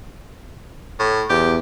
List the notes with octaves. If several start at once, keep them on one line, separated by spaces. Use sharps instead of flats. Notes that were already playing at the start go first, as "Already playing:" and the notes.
A2
E2 G4